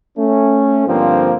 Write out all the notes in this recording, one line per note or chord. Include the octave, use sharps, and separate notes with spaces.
A3 C#4
G2 D3 F3 A#3 C4